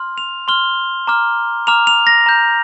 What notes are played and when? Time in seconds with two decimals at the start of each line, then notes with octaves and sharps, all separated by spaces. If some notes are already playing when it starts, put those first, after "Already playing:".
Already playing: C6 F6
0.18 F7
0.48 C6 F6 G7
1.07 A#5 D6 F6
1.67 A#5 D6 F6 F7
1.87 F7
2.07 A#6
2.26 A#5 G6